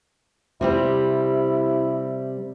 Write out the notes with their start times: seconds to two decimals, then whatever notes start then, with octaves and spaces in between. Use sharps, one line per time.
0.61 C3 G3 C4 E4